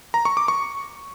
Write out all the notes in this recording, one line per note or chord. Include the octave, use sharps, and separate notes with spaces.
A#5
C#6
D6
C#6